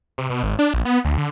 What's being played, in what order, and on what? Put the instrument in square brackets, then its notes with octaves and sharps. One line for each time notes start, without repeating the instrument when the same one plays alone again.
[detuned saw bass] C3
B2
G#1
D4
A#1
B3
D2
D3